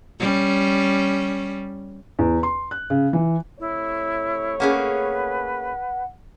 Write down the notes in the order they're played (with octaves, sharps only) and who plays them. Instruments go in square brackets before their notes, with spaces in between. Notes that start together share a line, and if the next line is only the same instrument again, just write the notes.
[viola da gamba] G3 C#4
[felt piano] E2
C6
F#6
C#3
E3
[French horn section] C3 A3 C#5 [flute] E4
[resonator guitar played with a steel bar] A#3 C#4 G#4 [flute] B4 [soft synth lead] F#5